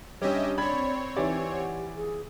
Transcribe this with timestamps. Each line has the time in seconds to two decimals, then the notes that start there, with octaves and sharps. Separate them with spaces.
0.22 G3 C#4 D4 G4 C#5 D#5 E5
0.58 C4 C#5 D5 B5 G#6
1.17 E3 D#4 G4 D5
1.50 F#5
1.96 G#4